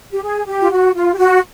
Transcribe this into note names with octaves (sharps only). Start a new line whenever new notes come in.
G4
G#4
G4
F4
F#4
F4
G4
F#4